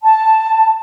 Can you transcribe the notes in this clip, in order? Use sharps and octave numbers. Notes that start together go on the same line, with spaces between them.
A5